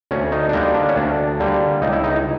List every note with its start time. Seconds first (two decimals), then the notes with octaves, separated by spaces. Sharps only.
0.11 D2 C#4
0.32 D#4
0.49 D4
0.53 D3 G3 A#3 D#4
0.75 D4
0.89 C#4
0.96 D2 D4
1.40 D3 G3 A#3
1.82 C#2 D#4
1.93 E4
2.04 D#4